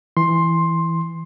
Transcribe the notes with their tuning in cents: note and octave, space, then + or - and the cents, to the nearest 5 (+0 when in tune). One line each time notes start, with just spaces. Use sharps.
E3 +0 C6 +10